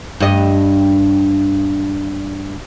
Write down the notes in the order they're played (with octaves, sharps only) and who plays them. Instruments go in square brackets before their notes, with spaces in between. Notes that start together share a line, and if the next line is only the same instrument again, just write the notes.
[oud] G2 D#5